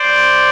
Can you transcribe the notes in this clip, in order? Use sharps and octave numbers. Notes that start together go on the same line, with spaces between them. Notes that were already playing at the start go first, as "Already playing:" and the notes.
Already playing: C5 D5